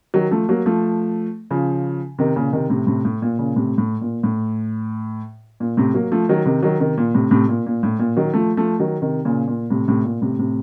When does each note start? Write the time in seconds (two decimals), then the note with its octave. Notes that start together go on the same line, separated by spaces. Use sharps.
0.14 D#3 F#3
0.31 F3 A3
0.49 F#3 A#3
0.66 F3 A3
1.51 C#3 F3
2.19 C3 D#3
2.36 A#2 C#3
2.53 C3 D#3
2.70 A2 C3
2.87 A2 C3
3.05 A2
3.22 A#2
3.39 A#2 C#3
3.56 A2 C3
3.78 A2
4.01 A#2
4.23 A2
5.60 A#2
5.77 A2 C3
5.94 F#3 A#3
6.12 F3 A3
6.29 D#3 F#3
6.46 C3 D#3
6.63 D#3 F#3
6.80 C3 D#3
6.98 A#2
7.14 A2 C3
7.31 A2 C3
7.49 A#2
7.66 A#2
7.83 A2
7.99 A#2
8.17 D#3 F#3
8.34 F3 A3
8.57 F3 A3
8.80 D#3 F#3
9.02 C3 D#3
9.25 A#2 C#3
9.48 A#2
9.70 A2 C3
9.88 A2 C3
10.04 A#2
10.22 A2 C3
10.39 A2 C3